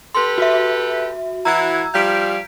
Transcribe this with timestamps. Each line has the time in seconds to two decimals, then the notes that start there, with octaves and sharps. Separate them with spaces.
0.15 G4 A4 B4 C6
0.38 F#4 E5
1.45 E3 E4 F#4 A#5 E6 G#6
1.94 F3 G3 F5 G6 B6 D7